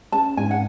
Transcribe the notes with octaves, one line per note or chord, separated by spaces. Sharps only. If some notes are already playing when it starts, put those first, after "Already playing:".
C#4 A5
G#2 G#5
F#5